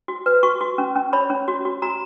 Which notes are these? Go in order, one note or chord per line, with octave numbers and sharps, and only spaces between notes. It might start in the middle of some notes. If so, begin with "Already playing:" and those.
F#4
B4
F#4 C#6
F#4
C#4
C#4
C#5 B5
C#4
F#4
F#4
F#4 A#5